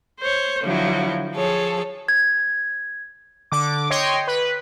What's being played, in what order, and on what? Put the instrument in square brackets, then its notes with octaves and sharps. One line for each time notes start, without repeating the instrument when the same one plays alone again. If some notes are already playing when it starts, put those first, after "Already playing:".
[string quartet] C5 C#5
D3 F3 F#3 E4
F3 G#4 A4 C#5
[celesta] G#6
[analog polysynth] D3 D6
C#5 D#5 G5 C6
B4